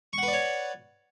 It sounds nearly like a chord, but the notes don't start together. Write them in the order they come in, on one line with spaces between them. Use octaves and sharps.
C#6 F#5 B4 D5 C#5